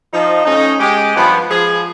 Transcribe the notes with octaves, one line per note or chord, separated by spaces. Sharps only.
F3 D#4
A3 C#4 D#4
G#3 G4
G2 F3 B3
F3 G#4